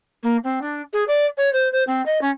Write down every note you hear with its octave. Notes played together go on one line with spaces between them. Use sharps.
A#3
C4
D4
G#4
D5
C#5
C5
C5
C4
D#5
C#4